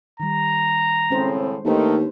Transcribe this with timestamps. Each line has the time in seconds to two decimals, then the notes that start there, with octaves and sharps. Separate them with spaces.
0.20 D#3 G3 A#5
1.10 A2 C#3 G#3 C4 C#4 C5
1.65 D#2 D#3 A3 D4 B4 C5